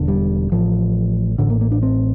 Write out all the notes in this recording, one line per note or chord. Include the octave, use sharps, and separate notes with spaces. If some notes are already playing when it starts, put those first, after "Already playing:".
Already playing: E1 E2 D3
G3
A1 A2 F3
A1 A2 D3
A#3
A#3
D4
C4